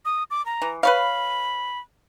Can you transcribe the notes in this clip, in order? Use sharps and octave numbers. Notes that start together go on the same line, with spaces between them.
D#6
D6
A#5
E3
B4 C#5 F5 B5